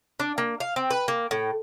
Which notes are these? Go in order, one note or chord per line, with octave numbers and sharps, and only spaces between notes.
D4
A#3
F5
C4
B4
A#3
A2